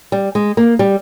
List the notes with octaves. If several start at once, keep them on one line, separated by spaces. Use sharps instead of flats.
G3
G#3
A#3
G3